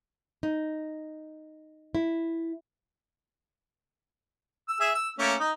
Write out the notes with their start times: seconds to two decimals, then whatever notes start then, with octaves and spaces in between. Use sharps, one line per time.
0.43 D#4
1.95 E4
4.68 E6
4.80 G#4 E5
4.95 E6
5.19 A3 A#3 C#4
5.40 D#4